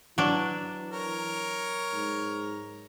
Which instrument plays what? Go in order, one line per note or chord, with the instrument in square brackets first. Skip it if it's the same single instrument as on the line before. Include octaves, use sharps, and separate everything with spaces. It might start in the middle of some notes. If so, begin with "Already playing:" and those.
[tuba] E3 [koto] F#3 D4
[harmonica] A#4 C#5
[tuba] G#2